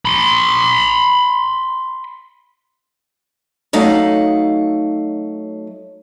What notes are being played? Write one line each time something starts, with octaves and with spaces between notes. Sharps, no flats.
B5 C6
F#3 A3 D#4 F5 F#5